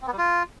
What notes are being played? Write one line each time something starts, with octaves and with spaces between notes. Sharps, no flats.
C4
B3
G3
F4